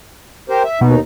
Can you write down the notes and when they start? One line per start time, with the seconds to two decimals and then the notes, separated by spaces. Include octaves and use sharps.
0.49 G4 A#4 C5
0.65 E5
0.81 D#2 B2 D#4